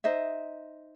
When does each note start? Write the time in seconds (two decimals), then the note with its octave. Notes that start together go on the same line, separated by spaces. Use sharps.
0.04 D#4 C5 D#5 E5